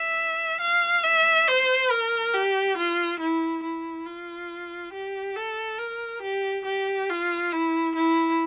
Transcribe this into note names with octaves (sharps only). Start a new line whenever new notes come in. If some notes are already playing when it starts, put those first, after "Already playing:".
Already playing: E5
F5
E5
C5
A#4
G4
F4
E4
E4
F4
G4
A4
A#4
G4
G4
F4
E4
E4